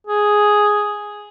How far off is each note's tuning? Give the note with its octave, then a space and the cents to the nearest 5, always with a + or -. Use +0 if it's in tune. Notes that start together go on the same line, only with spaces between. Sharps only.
G#4 +0